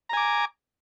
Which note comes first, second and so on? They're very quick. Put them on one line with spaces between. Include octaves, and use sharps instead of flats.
A#5 G#5 D6